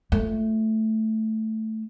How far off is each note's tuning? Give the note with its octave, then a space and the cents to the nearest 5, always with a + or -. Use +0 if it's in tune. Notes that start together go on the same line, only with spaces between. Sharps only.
A3 +0 F4 -20